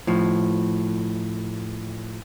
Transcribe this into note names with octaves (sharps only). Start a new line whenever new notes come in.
A2 F3